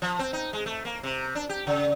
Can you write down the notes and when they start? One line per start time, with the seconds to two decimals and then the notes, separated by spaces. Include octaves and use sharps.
0.02 F3
0.19 C4
0.33 D#4
0.53 G#3
0.66 A3
0.85 A#3
1.03 C3
1.35 D4
1.49 G4
1.67 C#3